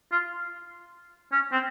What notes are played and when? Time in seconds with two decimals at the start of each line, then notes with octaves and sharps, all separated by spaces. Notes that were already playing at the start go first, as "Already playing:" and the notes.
0.12 F4
1.32 C#4
1.52 C4